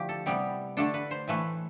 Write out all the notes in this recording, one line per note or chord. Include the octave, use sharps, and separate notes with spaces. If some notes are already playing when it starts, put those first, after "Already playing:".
Already playing: D3 F3 A3 E4 G4
A4
C3 G3 B3 E4 G4
D3 A3 D4 A4
B4
C5
A2 E3 A3 B4